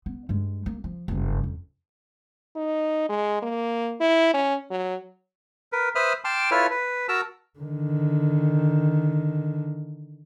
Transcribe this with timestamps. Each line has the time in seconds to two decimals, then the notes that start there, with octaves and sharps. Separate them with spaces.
0.06 B3
0.29 G2 G#3
0.66 A#3
0.84 F3
1.08 F#1 G2
1.44 F2
2.56 D#4
3.09 G#3
3.43 A#3
4.00 E4
4.34 C#4
4.71 F#3
5.72 A#4 B4
5.95 B4 C5 E5 B5 D#6 F6
6.25 G5 A5 C6 D6 F6
6.51 E4 F4 A4 B4 C#5 F6
6.70 B4
7.09 F#4 A#4 A5 A#5 E6
7.59 D3 D#3